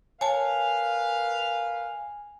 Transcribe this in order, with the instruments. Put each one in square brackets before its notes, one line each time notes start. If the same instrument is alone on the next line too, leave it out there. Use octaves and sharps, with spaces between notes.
[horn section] A#4 B4 F5 [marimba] C#5 A5 [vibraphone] G#5